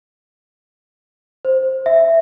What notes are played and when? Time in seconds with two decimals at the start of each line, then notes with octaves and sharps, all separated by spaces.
1.45 C5
1.86 E5